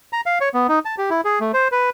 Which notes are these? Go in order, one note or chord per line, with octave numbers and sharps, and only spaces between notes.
A#5
F5
C#5
B3
D#4
A5
G4
E4
G#4
A3
C5
B4